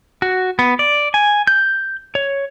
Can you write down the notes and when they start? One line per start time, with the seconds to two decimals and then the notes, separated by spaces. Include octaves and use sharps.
0.22 F#4
0.59 B3
0.79 D5
1.14 G#5
1.47 G6
2.15 C#5